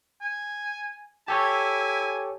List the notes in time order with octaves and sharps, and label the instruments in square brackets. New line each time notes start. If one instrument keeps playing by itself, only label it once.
[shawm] G#5
[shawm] E4 [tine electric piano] G4 A4 C#5 [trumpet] G#5